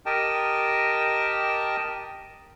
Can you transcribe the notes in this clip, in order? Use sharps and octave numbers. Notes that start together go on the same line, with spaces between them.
G4 A#4 D#5 G5 A5